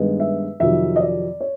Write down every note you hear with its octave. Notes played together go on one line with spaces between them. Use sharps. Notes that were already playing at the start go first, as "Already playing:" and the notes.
Already playing: G2 D#3 G#3 B3
E5
F2 C3 D#3 F#3 E5
D#5
D5
C#5